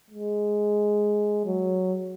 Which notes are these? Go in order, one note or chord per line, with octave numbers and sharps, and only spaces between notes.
G#3
F#3